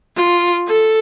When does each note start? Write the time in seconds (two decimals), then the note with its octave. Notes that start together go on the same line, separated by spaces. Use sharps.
0.16 F4
0.68 A4